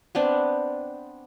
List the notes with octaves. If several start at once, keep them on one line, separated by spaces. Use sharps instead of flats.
B3 C4 D4